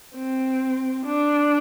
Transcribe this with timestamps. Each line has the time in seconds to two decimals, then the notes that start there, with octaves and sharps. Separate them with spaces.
0.15 C4
1.05 D4